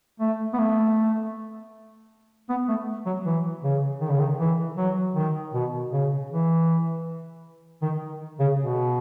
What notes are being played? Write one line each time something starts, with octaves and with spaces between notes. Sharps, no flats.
A3
B3
A3
B3
A3
F#3
E3
C#3
D#3
C#3
D#3
E3
F#3
D#3
B2
C#3
E3
D#3
C#3
B2